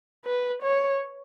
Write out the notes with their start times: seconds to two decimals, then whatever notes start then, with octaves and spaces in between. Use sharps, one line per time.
0.25 B4
0.63 C#5